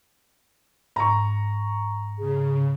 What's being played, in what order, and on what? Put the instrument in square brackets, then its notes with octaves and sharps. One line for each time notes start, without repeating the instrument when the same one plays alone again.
[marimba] G#2 [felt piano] A#5 C#6
[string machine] C#3 [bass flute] G#4